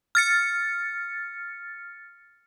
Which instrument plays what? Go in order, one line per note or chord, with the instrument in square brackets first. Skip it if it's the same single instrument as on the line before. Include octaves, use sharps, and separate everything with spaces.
[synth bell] F6 A6 C#7